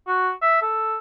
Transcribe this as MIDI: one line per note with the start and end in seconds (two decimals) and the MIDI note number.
0.07 0.31 66
0.42 0.61 76
0.62 0.98 69